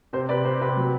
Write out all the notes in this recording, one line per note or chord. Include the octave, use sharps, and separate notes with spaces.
C3 C5
C3 B4 D5
C3 C5
C3 B4
F#3